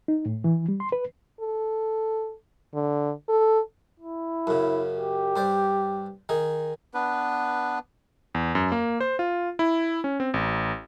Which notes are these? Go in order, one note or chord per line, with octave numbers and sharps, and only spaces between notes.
D#4
A2
E3
G3
C6
B4
A4
D3
A4
E4
F#2 C#3
G4
G2 C5 D5
D#3 D#4 G#4
B3 D4 B4
E2
F#2
A#3
C5
F4
E4
C#4
C4
A1